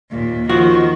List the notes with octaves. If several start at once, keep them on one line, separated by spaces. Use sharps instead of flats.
D#2 A#2
D#3 F3 F#4